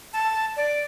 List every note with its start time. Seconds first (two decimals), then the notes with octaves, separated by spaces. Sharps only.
0.13 A5
0.56 D5